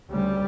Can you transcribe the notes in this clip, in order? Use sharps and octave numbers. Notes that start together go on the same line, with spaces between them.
D2 C#3 G3